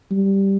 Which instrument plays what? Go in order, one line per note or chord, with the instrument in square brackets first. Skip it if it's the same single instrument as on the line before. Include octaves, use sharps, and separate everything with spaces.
[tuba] G3